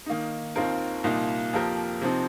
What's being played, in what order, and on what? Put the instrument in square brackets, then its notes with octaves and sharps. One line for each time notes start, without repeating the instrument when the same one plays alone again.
[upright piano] D#3 A#3 D#4
D#2 D#3 C4 F4 A#4
C2 A#2 A#3 D#4
F2 F3 A#3 G4 A#4
C3 F3 C4 D#4